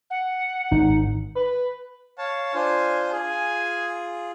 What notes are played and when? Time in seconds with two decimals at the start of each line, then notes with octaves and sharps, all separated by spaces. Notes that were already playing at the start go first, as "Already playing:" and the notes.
0.10 F#5
0.72 G#1 D#4
1.36 B4
2.18 C#5 F5 A5
2.54 D4 F4 C5 G#5
3.12 F4 G#4 G#5